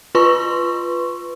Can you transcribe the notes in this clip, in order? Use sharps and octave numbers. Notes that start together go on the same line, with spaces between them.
F4 B4 C6 C#6